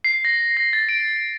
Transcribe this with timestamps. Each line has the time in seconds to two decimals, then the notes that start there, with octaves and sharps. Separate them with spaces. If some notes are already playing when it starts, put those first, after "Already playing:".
0.04 C7
0.25 A#6
0.57 A#6
0.73 A6
0.89 D7